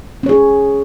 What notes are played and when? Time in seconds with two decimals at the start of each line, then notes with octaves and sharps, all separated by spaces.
0.23 C#4
0.26 C#5
0.29 G#4